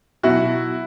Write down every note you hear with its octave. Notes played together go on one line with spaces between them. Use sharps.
B2 F#3 E4 F#4